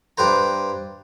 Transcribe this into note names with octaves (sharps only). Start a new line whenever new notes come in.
G2 G4 B4 C5 A#5